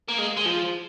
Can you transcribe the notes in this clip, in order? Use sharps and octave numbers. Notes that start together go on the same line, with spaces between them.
A#3
G#3
G#3
F3